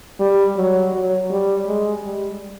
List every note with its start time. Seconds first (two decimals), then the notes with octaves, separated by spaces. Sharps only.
0.20 G3
0.57 F#3
0.93 F#3
1.30 G3
1.67 G#3
2.03 G3